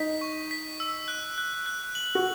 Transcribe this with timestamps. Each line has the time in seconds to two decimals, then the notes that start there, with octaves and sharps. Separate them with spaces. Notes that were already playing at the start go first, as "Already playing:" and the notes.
Already playing: D#4 B6
0.21 C#6
0.51 B6
0.80 E6
1.08 F#6
1.38 F#6
1.66 F#6
1.95 F#7
2.15 F#4